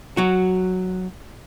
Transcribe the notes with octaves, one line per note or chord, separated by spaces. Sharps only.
F#3 F#4